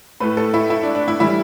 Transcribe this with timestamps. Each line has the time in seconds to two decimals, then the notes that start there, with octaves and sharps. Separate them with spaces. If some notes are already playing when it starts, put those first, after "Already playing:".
0.20 A2 A3 B4
0.37 A4
0.54 E4
0.70 E4
0.83 D4
0.95 D4
1.08 E4
1.20 E3 G3 E4